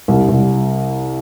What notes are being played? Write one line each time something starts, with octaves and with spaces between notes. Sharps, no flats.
C2
C2